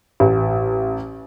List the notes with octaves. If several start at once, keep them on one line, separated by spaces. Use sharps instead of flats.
A1